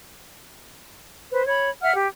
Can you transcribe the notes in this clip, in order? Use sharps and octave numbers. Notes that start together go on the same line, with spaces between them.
B4 C5
C#5 B5
E5 F#5 F6
G4